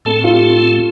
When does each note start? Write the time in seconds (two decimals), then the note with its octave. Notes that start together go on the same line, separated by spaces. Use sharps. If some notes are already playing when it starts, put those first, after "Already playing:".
0.05 A2 A3 C4 A4
0.24 F4
0.33 G4